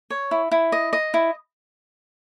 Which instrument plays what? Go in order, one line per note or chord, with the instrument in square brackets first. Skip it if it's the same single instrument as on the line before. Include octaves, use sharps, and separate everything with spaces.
[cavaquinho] C#5
E4
E4
D#5
D#5
E4